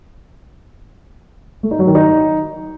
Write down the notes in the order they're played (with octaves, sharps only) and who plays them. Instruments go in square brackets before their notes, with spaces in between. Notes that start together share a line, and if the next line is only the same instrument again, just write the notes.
[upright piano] A3
D#4
F#3
D#3
D#4